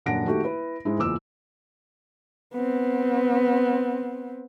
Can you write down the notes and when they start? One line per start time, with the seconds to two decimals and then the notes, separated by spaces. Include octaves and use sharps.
0.06 D#1 F#2 D4 F#5 A#6 D7
0.26 D#3 A3 F#4 G4
0.44 E4 B4
0.85 G#2 G#3 E4
0.98 F#1 E2 F4 D6 E6
2.53 B3 C4